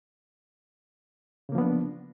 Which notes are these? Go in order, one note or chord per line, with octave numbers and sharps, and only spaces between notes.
C#3 F3 A#3 B3 D4